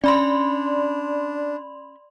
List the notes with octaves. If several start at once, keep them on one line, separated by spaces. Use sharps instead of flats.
C#4 D4 D5 B5 C6